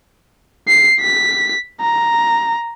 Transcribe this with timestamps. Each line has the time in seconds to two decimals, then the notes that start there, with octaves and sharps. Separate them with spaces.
0.68 C7
1.00 B6
1.81 A#5